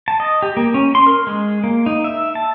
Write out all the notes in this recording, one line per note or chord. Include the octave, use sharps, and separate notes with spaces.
A5
D#5
G4
A#3
C#4
C6
A#4
G#3
A#3
D#4
E5
A5